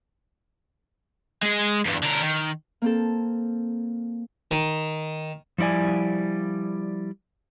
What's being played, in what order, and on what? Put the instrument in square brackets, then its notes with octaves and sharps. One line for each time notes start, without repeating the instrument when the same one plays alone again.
[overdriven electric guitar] G#3 G#4
E2 G2
D3 A#4
D#3
[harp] A#3 C4 A4
[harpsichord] D#3
[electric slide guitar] F3 G3 E4 D5 G#5